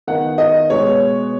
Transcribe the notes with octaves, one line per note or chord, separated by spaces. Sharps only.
D#3 B3 F#5
D#5
B2 G#3 B3 C#5